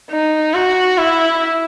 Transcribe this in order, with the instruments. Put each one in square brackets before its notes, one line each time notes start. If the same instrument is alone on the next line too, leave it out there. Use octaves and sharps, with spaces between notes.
[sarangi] D#4
F#4
E4